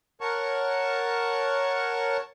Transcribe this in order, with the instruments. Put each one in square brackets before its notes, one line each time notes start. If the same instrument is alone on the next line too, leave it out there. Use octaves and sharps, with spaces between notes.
[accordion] A#4 C#5 F#5 A5 C#6